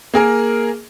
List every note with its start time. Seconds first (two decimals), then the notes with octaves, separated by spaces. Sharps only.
0.14 A#3 G#4 A#4